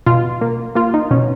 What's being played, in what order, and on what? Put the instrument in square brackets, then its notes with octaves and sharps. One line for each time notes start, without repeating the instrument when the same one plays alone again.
[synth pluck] B2 F4
A#3
A#3 F4
D#4
B2 C#4